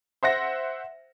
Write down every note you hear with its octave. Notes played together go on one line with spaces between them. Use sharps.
C5 E5 F#5 A#6